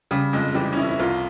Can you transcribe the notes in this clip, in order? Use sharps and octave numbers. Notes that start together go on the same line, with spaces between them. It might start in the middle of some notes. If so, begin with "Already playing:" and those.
C#3 G3
F2 G#3
E3 G3
C#4
F2 E3 E4
E4
C2 F3 F4